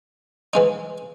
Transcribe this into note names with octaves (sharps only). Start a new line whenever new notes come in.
E3 G#3 D#4